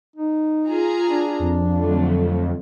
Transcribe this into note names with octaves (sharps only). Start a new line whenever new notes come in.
D#4
F4 G#4 A#5
D4
F2
D3 F#3 A3